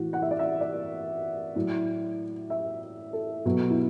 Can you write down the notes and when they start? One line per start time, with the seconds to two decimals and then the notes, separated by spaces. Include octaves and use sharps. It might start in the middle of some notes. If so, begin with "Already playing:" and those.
Already playing: A2 E3 F#4
0.13 F#5
0.22 E5
0.31 D5
0.39 E5
0.61 D5
1.56 A2 F#3
2.50 E5
3.13 A4
3.46 B2 F#3 F#4
3.70 E4